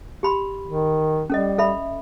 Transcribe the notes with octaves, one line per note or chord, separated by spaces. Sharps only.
G4 B5 C6
D#3
G3 C#4 A4 D#5
A4 E5 B5